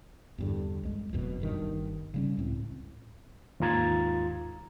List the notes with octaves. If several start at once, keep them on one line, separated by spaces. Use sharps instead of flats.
E2 G2 D3
C2 G#3
F1 C2 F#2 B2
G1 G2 D#3
C#3 G3 C#4
C#2 A2 C4
D#2 G#2 F4 A#5 G#6 A6